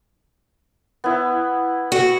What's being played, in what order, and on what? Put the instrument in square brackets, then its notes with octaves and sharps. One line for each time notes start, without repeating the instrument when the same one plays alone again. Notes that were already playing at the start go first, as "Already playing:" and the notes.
[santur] B3 E4
[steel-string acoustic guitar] F#4